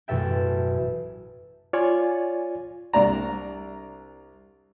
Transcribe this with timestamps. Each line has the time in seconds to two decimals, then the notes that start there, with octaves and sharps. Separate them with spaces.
0.08 A1 F#2 B2 A4 E5 G5
1.73 F4 C#5 D5 F5 G#5
2.93 C2 D4 D5 A#5